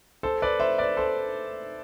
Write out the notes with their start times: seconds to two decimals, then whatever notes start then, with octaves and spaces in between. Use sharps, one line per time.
0.23 A4 C5
0.42 B4 D5
0.60 C5 E5
0.78 B4 D5
0.97 A4 C5